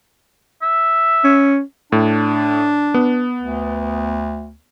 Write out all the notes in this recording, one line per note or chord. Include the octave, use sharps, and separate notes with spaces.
E5
C#4
A2 D4
B3
D2